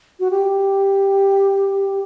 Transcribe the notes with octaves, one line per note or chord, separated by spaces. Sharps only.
F#4
G4